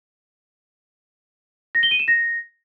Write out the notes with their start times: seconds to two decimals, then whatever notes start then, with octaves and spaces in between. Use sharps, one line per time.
1.75 A#6
1.83 G7
1.91 D#7
1.99 E7
2.08 A#6